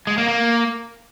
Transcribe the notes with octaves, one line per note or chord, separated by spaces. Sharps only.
G#3
A#3
A#3